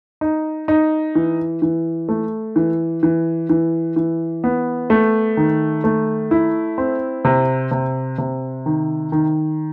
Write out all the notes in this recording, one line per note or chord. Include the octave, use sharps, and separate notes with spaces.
D#4
D#4
E3
E3
A3
E3
E3
E3
E3
B3
A3
D#3
A3
E4
C4
C3
C3
C3
D#3
D#3